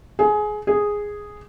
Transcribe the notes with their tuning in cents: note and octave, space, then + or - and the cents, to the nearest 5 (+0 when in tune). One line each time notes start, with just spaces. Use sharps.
G#4 +20
G#4 -5